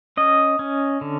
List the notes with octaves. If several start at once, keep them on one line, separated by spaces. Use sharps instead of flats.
C#4 D#5
C#4
D3